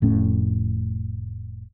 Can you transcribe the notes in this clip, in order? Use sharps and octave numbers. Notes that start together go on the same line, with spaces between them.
F1 A2 C#4